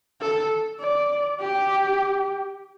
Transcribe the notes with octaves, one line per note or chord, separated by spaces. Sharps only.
A4
D5
G4